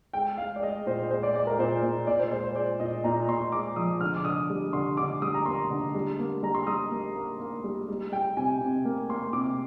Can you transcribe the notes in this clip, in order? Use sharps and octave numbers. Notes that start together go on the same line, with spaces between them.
G#3 G5
G#3 F5
D5
G#3 D#5
A#2 C5
G#3 C5
D5
G#3 D5
A#4
A#2 C5
A#2
A#2 D5
C5
G#3 C5
C5
G#3 D5
A#2 D#5
A#2 A#5
A#2 C6
G#3 D6
F3 D#6
D3 F6
D6
D3 D#6
G3
D3 C6
D3 D6
G3 D#6
A#5
A#3 C6
D3
G3
A#3
G3 A#5
C6
G3 D#6
A#3
A#3
A#3
G3
G3
G3 G5
C3 G#5
C3
A#3
A#3 C6
C3 D6